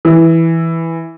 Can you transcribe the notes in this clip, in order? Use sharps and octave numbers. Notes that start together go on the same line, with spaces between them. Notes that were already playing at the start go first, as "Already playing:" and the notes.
E3